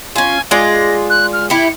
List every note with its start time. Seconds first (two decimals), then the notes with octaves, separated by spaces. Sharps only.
0.16 C#4 F4 G#5
0.51 G#3 F4 D5 A#6
1.10 F#6
1.33 F6
1.50 E4 G4 C#7